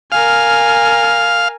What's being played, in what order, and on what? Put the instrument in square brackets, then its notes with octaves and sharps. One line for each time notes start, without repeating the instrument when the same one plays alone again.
[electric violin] A#4 G#5 [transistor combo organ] F5